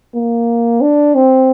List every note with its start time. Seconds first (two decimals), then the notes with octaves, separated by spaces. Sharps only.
0.16 A#3
0.81 D4
1.15 C4